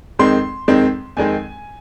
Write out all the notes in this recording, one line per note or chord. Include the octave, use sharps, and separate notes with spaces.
F2 D#3 G#3 C4 C6
F2 D#3 G#3 C4
F2 D#3 G#3 C4 G#5